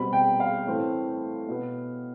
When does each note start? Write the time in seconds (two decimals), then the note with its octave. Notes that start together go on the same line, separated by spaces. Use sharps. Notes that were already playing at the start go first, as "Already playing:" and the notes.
Already playing: B2 G3 C4 B5
0.13 G5
0.40 F5
0.67 A2 E3 A3 C4
1.49 B2 B3